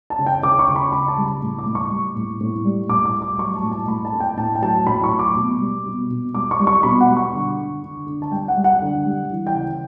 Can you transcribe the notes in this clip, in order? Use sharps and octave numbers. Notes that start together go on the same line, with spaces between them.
A5
C#3
G5
C#3 D6
C#6
C#3
B5
C#3 B5
A5
G3
B5
A2
D6
A2
C#6
G3
A2
A2
G3
A2 D6
D6
G3
D6
F#3 C#6
A5
A2
A5
A2 B5
A5
A3
G5
A2 A5
G5
F#3 A5
A2 B5
C#6
F#3
D6
B2
G3
B2
B2
G3 D6
C#6
G3
C#6
B2 B5
F#5
G3
C#6
D3
D3
D3
D3
A5
G3 G5
F#5
G3
F#5
D3
G3
E3
G5
C#3